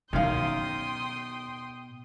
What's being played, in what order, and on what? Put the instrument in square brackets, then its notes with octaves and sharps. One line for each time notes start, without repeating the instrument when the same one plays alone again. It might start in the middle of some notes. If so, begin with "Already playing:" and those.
[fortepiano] F#2 D#3 F5 [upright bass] B2 [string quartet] G5 C6 D#6